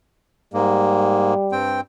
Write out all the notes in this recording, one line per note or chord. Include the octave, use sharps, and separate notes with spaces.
G#2 G3 A#3
G2 C4 G5